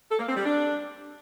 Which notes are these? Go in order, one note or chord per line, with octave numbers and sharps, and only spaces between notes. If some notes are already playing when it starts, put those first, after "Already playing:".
A4
A#3
C4
G3
D4